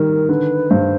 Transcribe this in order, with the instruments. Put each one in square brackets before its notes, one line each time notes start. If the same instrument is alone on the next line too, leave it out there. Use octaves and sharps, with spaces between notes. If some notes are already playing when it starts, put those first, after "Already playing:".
Already playing: [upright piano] D#3 G3 [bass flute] A#4
[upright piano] D3 [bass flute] B4
[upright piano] G2 [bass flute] C5